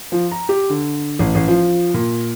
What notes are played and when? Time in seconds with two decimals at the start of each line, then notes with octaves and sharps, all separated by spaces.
0.12 F3
0.32 A#5
0.49 G4
0.70 D3
1.19 A1
1.35 A1
1.48 F3
1.94 A#2